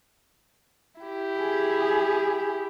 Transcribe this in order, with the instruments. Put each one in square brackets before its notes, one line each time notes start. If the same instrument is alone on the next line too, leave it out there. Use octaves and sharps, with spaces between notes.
[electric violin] E4 G4
[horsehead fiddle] G#4